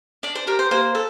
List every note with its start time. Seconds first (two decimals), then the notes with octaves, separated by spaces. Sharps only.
0.23 D4 D5
0.35 C5
0.47 G4 A#4
0.59 C5
0.71 A#3 C5
0.95 A4